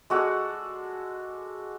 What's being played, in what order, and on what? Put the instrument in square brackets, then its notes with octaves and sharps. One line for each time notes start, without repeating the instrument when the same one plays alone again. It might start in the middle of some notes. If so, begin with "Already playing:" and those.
[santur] G#3 F#4 A4 D5